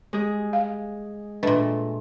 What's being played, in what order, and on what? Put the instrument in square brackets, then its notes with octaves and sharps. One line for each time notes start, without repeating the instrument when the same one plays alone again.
[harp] G#3 G#4
[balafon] F5
[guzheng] A#2 A3 [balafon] D4 B4 D#5